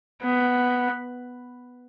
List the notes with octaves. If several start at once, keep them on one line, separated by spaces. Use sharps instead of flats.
B3